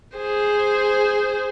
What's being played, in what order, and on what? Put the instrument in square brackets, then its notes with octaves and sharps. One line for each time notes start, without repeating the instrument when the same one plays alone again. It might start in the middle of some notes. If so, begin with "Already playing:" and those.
[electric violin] G#4 C5